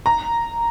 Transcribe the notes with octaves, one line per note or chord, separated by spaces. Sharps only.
A#5